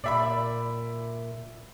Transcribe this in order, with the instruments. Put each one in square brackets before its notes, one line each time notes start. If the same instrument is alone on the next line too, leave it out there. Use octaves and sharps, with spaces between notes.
[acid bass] A#2 [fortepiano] D5 E5 B5